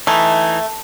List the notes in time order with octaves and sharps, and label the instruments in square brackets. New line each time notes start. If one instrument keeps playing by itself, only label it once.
[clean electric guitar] E3 D#4 [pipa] A3